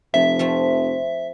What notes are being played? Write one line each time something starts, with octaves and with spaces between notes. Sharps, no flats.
F1 F3 E5
F3 A3 C4